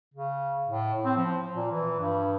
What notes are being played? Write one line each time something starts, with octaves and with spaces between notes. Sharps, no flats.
C#3
A2
C4
F3
A#2
E3
G2